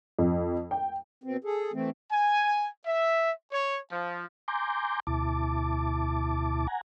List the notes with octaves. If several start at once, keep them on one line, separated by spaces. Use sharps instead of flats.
F2
G5
B2 C4
G#4 A4
E3 A3 C4
G#5
E5
C#5
F3
G#5 A#5 C6 D6 G6
D2 B2 E4 A5 D6
F#5 G#5 A#5